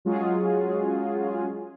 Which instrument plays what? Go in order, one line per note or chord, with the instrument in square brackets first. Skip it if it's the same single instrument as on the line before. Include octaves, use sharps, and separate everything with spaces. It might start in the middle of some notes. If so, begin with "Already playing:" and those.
[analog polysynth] F#3 G#3 C#4 F4 F#4 G#4